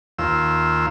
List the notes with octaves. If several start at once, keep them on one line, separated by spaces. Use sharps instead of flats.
D#2 F4 E6